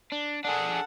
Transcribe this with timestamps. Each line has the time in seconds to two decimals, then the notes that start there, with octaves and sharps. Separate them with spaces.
0.12 D4
0.45 D4 G#4 A4 F#5